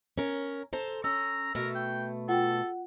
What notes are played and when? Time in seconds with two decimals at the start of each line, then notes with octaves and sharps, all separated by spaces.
0.18 C#4 A#4
0.73 A4 C5 A#5
1.04 C#4 A#5 E6
1.55 B2 A3 A#4
1.75 G5
2.29 F4 A4 F#5 G5